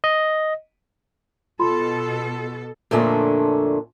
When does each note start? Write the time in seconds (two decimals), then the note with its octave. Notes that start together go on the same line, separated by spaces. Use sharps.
0.04 D#5
1.59 B2 F4 A4 B5 C6
2.91 F2 A#2 D3 A3 C#4 D4